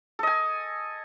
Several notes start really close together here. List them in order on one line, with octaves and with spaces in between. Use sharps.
A4 D#5 G#5